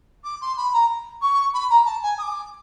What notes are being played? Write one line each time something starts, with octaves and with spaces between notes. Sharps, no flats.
D6
C6
B5
A#5
C#6
B5
A#5
A5
G#5
D#6
D6